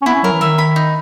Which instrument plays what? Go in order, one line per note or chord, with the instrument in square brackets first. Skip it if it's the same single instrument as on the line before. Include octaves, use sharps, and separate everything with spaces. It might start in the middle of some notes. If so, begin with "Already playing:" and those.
[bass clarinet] C#4
[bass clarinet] B3 [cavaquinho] E4
[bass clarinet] C#4
[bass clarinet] F#3 [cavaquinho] A#4
[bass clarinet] E3
[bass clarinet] D#3 [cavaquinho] E5
[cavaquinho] B5
D#4